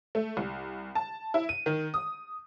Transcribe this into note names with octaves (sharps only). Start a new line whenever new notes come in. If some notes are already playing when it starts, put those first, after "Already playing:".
A3
C2
A5
E4
D#7
D#3
D#6